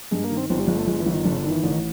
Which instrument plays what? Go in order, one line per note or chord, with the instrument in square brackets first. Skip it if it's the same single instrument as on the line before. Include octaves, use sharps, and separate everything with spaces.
[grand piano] G2 [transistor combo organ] G#3
[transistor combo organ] A#3
[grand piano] D#3
[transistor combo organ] C4
[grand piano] G1 [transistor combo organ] C4
[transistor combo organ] G3
[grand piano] G1 [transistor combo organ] G#3
[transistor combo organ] A3
[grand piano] G1 [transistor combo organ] G#3
[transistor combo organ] E3
[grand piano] G1
[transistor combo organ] D#3
[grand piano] G1 [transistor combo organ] D3
[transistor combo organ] C#3
D3
[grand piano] D#3
[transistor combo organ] E3
[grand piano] A1 [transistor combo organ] D3
[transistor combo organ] D#3